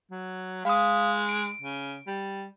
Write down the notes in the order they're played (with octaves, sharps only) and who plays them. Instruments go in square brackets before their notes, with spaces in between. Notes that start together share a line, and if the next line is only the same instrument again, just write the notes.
[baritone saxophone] F#3
[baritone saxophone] G#3 [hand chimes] F5 D#6
[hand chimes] D7
[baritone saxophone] C#3
G3